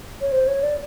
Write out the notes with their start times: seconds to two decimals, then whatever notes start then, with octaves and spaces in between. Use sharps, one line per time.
0.21 C#5
0.32 C5
0.48 C#5
0.63 D5